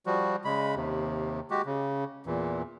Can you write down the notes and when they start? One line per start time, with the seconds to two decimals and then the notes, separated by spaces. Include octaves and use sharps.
0.06 F3 G3 F#4
0.45 C#3 G#3 B5
0.76 D#2 C3
1.50 G#3 F#4 G4
1.65 C#3
2.26 E2 A#2 E3